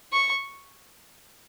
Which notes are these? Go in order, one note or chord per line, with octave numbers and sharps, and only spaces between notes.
C#6